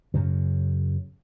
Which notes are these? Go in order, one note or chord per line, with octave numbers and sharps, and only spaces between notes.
F#2 C#3